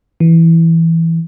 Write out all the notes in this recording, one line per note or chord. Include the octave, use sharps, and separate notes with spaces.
E3